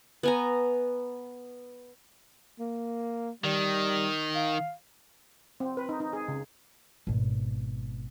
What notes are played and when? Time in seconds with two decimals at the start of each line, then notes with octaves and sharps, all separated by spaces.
0.23 B3 G#5 A#5
2.59 A#3
3.44 D#3 G3
4.35 F5
5.60 C4
5.77 B4
5.89 D#4
6.00 D#4
6.13 G#4
6.28 C#3
7.07 G#1 B2